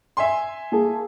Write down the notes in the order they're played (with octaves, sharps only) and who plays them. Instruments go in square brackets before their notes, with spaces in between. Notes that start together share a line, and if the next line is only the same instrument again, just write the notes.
[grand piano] E5 G#5 C6
[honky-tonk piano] A#3 G#4 A5